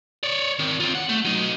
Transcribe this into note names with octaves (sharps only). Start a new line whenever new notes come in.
C#5 D5
D#3 C4
C4 F4
F#5
A3
F#3 D#4